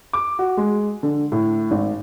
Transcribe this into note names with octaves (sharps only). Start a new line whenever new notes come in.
D6
F#4
G#3
D3
A2
G#1